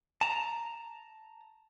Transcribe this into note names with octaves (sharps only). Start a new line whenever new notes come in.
A5 A#5